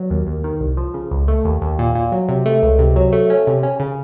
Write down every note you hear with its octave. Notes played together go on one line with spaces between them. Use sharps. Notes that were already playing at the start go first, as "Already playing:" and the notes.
Already playing: F#3
D#2
D#2
D#3
C2
F3
C#3
C#2
A3
D#2
D#2
A#2
A#2
F#3
C3
A3
C#2
C3
F#3
A3
C#4
C3
C#4
C#3